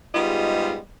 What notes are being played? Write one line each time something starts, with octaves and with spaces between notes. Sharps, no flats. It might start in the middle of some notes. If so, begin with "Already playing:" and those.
G#2 G3 G#3 B3 F4 D#5